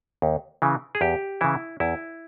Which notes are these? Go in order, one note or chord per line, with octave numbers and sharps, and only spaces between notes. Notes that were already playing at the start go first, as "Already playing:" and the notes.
D#2
C#3 E3
G#4
E2 G4
C#3 E3 E4
E2 E4